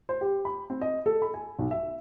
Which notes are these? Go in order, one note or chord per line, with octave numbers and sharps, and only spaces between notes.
C5
G4
B5
C4
D#5
A4
B5
G#5
B1
E5